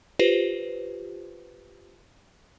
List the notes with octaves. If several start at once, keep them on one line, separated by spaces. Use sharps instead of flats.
F4 G4 B4 C5